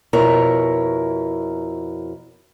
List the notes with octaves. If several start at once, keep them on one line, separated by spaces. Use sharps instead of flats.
F2 B2 E4 A#4 C#5 A#5